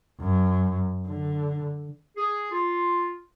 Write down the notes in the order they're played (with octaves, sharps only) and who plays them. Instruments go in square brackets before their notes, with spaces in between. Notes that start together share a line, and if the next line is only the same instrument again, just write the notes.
[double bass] F#2
D3
[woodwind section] G#4
F4